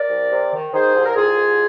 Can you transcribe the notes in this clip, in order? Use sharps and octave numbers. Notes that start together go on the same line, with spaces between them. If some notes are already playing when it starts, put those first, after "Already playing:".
Already playing: A#4 D5
C2
C3
D#3
D#3 G#4 C5
C2
A#4
C2 F4 G#4
C2